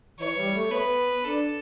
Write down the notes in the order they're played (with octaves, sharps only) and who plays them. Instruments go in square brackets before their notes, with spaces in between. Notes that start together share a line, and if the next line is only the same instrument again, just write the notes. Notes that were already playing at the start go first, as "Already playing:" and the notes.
[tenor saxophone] E3 [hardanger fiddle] C#5
[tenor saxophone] G3
A3
[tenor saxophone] B3 [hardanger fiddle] B4
[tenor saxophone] D4 [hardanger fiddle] A4